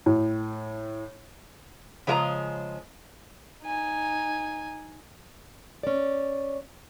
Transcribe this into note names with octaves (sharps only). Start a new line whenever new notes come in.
A2
C#3 F3 G#3 D#5 A#5
D#4 G#5
C#4 D5